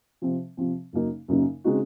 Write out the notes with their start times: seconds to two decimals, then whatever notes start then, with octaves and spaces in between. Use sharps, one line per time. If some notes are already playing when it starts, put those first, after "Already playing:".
0.22 C3 F3 C4
0.57 C3 F3 C4
0.93 F#2 C#3 F#3 A#3 D#4
1.28 F#2 C#3 F#3 A#3 D#4
1.64 C#3 G#3 C4 D#4 F#4